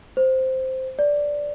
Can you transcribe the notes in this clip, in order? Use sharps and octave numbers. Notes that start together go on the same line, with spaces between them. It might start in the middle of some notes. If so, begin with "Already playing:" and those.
C5
D5